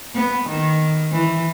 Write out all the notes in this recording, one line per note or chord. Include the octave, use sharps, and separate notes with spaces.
B3
D#3
E3